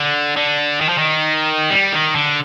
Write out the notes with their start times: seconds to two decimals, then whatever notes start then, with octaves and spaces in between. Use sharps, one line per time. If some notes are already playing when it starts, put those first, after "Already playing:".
Already playing: D3
0.37 D3
0.81 D#3
0.89 F3
0.98 D#3
1.70 G3
1.92 D#3
2.15 D3